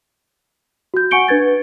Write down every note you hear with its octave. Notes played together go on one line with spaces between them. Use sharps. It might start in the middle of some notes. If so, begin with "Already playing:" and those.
F#4 G6
F#5 G#5 C#6 C#7 D7 G7
D4 B4 G#6 A6